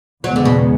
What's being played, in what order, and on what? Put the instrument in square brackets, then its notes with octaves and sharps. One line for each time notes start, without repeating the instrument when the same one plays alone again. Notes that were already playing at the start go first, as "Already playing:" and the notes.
[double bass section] E2 C#3 G#3 B3 [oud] F#3
[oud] D3
B2